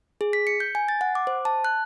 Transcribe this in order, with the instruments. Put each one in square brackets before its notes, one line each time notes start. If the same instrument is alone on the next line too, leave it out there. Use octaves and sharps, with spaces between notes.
[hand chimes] G#4
B6
C#7
G6
G#5
A6
F#5
D6
C5
A5
F#6